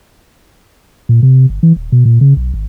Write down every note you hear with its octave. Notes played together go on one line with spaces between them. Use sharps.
A#2
C3
G1
E3
D#1
B2
A#2
C#3
B1
G#1